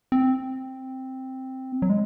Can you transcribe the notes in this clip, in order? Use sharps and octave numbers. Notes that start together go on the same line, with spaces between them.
C4
F#3
G#3